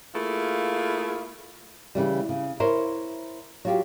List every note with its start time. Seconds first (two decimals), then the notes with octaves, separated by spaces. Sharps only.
0.15 A3 A#3 E4 F4 G#4
1.95 C#3 E3 G3
2.29 C#3
2.60 E4 A#4 C5 C#5
3.65 F#3 F4 G4